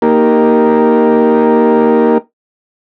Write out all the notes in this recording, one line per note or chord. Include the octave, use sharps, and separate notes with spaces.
A#3 D#4 G4 A#4